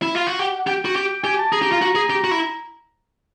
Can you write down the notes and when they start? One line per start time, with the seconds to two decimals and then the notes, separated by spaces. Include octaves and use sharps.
0.02 E4
0.15 F4
0.27 F#4
0.39 G4 F#5
0.59 F#5
0.67 G4 G5
0.85 F#4
0.96 G4
1.24 G4 G#5
1.39 A5
1.52 G#4 A#5
1.62 G4
1.72 F4
1.82 F#4
1.95 G#4
2.10 G4
2.24 F#4
2.31 E4